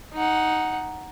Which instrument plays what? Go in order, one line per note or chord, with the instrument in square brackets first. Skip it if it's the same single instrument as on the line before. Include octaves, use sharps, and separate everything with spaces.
[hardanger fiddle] D#4 F#5